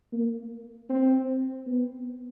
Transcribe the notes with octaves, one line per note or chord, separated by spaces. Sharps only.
A#3
C4
B3